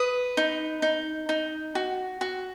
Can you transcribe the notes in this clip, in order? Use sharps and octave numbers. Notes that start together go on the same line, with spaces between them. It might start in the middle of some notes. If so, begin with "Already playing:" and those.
Already playing: B4 D#6
D#4
D#4
D#4
F#4
F#4